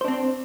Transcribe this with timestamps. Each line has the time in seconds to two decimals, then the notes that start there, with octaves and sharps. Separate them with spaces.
0.01 C5
0.05 D4
0.08 C4